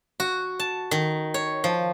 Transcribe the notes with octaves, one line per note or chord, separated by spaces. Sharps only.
F#4
A5
D#3
C#5
F3